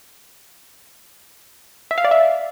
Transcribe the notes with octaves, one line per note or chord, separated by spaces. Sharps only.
E5
F5
D5
E5